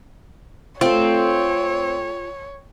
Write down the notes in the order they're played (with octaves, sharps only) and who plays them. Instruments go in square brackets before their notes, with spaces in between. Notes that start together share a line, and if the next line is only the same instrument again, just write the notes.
[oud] A3 A4 [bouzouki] C4 [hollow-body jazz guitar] F4 [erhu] C#5